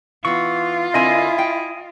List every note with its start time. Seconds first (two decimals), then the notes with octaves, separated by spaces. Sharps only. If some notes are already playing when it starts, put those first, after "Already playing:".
0.25 E3 B3 F4 C#6
0.94 D3 C4 E4 A#4 D#5 G#5
1.38 G5